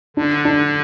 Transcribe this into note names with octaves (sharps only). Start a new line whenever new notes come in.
D3 D4
D4